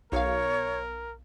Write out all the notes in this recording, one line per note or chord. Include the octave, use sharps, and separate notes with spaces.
B1 A#4 C#5 F5